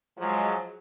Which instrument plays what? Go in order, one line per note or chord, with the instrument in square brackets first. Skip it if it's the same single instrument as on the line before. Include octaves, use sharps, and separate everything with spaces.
[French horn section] F3 F#3 G#3